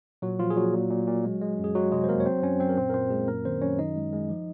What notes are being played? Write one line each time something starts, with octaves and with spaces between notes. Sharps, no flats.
A#2 F#3 F#4
A#2 F3 F4
G#4
A#2 F#3 F#4
A#2
A#2
A#2
G#3
G#3
F#2
G#4
F#3 G#3 F#4
C3 G#3 G#4
C5
F2 A#3 A#4
C#5
F#3 C4 C5
F#2 C#4 C#5
F#2 C4 C5
A#4
A#2 C4 C5
A#4
A#2 C4 C5
A#2 G#3 G#4
F#2 A#3 A#4
D#3 C4 C5
F#2 C#4 C#5
D#3 D#4 D#5
G#3
G#3
F3